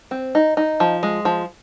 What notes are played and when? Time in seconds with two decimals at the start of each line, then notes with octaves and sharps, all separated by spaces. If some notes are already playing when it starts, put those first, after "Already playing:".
0.11 C4
0.35 D#4
0.57 D#4
0.80 F3
1.03 G#3
1.25 F3